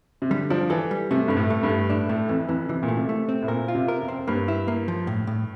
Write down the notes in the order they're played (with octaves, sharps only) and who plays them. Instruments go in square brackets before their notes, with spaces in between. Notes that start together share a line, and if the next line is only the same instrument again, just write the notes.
[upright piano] C3
[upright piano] D3 [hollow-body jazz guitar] G3
[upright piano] F3 [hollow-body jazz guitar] D4
[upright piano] E3 [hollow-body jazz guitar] A4
[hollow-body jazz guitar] G3
[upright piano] C3 [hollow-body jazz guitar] A3
[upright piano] G2 [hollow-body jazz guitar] A3
[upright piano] A2
[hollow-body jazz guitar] A3
[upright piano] G2
[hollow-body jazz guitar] A3
[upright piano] A2 [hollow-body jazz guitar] D4
[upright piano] A2 [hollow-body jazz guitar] A3
[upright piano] F2 [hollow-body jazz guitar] E3
[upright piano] F2 [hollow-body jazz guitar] E3
[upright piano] C3 [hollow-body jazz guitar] E3
[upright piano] A#2
[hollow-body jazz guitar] A3
[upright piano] C3
[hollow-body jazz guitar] A3
C4
[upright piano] A2
[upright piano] A#2 [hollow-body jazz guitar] A#4
[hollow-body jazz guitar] F4
[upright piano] C3
[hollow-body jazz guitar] A#4
[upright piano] F2
[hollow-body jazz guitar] C4
[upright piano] F2
[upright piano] G2 [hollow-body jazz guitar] A#3
[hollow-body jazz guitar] E4
A#3
F3
A2
A2